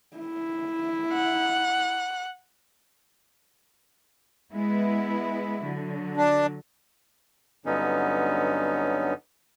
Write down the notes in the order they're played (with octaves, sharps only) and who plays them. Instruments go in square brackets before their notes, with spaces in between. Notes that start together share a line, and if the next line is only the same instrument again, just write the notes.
[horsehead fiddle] E4
[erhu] F#5
[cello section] G#3 B3 E4
D3 F#3
[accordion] D4
[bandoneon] G2 D3 F#3 B3 C#4 D#4